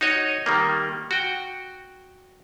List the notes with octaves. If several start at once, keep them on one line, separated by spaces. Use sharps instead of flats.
D#4 F#4 C#5 D#5
D#3 G3 A#3
F#4 G5